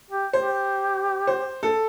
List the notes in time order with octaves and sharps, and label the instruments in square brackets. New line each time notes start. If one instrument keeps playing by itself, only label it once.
[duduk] G4
[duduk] G4 [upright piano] C5
[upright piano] C5
A4